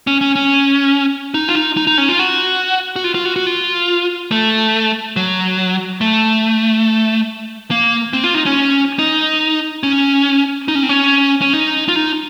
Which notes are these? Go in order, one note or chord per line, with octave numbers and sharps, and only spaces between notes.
C#4
C#4
C#4
D#4
F4
D#4
D#4
D#4
C#4
F4
F#4
F#4
F4
F4
F#4
F#4
F4
A3
F#3
A3
A#3
C4
F4
D#4
C#4
D#4
C#4
D#4
C#4
C4
C#4
C#4
D#4
F4
D#4